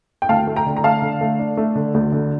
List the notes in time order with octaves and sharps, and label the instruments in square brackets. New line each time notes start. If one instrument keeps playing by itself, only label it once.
[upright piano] G5
D2 F5 A5
A3
G5 A#5
D3
A#5
A3 F5 A5
D3
A3
D4
A3
D3
D2
D3